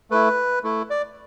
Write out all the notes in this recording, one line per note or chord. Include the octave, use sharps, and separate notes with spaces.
A3 E4 B4
A3 E4
D5